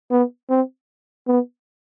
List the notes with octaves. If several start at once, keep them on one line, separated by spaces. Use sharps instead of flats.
B3
C4
B3